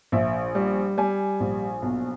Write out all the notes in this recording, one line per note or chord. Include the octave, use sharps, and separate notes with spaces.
A#1 E5
G3
G3 G#5
A#1
B1